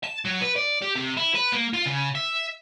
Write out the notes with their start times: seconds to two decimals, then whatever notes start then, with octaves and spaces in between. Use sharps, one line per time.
0.04 A5
0.25 F#3
0.41 B4
0.56 D5
0.82 G4
0.96 C3
1.17 E4
1.35 B4
1.53 A#3
1.73 F4
1.86 C#3
2.15 E5